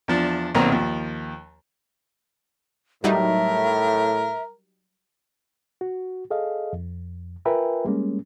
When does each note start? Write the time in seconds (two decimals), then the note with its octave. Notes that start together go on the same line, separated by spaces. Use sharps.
0.08 E2 F3 D4
0.55 B1 A#2 D#3 C4 A#5
0.71 D#2 F3
3.04 A2 F#3 G3 D#4 A#4 E5
5.81 F#4
6.31 G#4 A4 D#5 F5
6.73 F2
7.45 F4 A#4 B4 E5 G5 G#5
7.85 G3 G#3 A#3 C#4